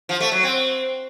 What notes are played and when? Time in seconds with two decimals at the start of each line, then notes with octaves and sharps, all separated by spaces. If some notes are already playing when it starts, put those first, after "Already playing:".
0.09 F3
0.20 A3
0.32 F#3
0.43 C4